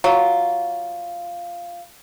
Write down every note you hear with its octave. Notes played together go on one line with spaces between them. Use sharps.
F#3 F4